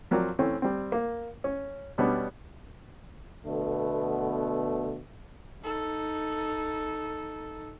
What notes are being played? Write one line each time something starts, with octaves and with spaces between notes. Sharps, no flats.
F3 F#3 C4 A#4 D5
E3 A3 C4 C#4
G3 C4
A#3
C#4
B2 G3 B3 C#4 D4
B2 D3 A3 B3
D#4 A4